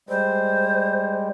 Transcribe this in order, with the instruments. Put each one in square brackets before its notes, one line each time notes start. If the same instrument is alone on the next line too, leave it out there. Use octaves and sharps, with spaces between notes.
[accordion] G3 G#3 [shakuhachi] C5